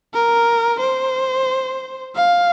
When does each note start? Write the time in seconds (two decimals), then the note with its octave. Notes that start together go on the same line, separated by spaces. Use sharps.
0.14 A#4
0.80 C5
2.16 F5